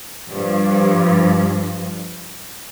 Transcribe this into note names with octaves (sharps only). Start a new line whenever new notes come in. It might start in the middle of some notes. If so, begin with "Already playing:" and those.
G2 F3